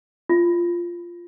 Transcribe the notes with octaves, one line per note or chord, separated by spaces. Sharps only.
F4